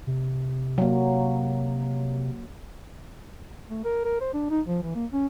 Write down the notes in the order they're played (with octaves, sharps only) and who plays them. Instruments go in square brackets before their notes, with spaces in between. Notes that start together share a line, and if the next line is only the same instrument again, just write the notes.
[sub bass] C3
[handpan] F#3 A#3
[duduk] A3
A#4
A#4
C5
D4
D#4
F3
E3
A#3
C#4